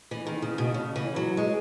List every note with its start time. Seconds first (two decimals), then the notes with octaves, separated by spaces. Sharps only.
0.11 E3
0.27 D#3
0.42 C#3
0.58 B2
0.74 C#3
0.96 E3
1.16 F#3
1.37 G#3